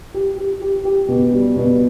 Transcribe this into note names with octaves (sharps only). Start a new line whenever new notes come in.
G4
G4
G4
G4
B2
G3
B2